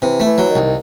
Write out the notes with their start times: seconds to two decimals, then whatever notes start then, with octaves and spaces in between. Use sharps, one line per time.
0.02 C3 E3
0.20 A3
0.25 E3
0.38 F#3
0.49 D#3
0.56 C2